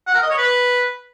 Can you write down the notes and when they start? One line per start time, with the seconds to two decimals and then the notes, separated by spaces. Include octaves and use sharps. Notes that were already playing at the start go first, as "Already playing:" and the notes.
0.07 F#5
0.15 A#4
0.23 D#5
0.30 C#5
0.38 B4